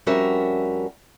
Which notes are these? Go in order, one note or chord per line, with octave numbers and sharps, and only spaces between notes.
F2 G3 C#4 F#4 A#4 E5